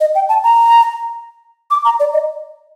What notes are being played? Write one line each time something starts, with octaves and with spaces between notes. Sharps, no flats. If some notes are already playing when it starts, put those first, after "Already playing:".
D#5
G5
A5
A#5
D6
A#5
D5
D#5